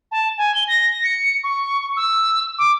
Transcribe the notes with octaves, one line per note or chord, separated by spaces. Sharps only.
A5
G#5
G7
A#6
C#7
C#6
E6
D6